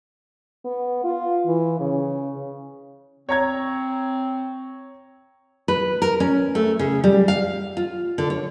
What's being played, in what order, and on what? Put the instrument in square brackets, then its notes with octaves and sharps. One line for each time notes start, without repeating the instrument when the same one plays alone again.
[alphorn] B3
F4
E3
C#3
[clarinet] C4 [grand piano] C#5 A#5 G#6
[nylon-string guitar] B4
A#4
C#4
A3
C#3
G3
F5
F4
D3
C#5